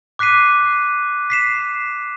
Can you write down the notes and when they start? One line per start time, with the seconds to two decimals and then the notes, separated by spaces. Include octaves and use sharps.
0.19 D6 F#6 B6 C7 D#7
1.30 B6 C7 E7